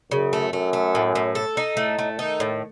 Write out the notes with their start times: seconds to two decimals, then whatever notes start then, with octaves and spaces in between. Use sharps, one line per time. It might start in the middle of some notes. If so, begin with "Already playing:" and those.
0.11 F#2 C#3
0.33 A3
0.53 F#2 A3
0.73 A3
0.95 A2
1.15 A2
1.35 A4
1.57 D#4
1.77 A2 A3
1.99 A3
2.19 D#3 D#4
2.40 A2